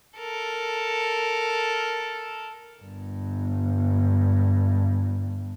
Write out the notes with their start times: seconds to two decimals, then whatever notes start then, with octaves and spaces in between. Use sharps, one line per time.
0.19 A4 A#4
2.81 G1 G2